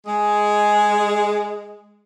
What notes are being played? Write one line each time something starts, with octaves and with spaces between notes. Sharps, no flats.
G#3 G#4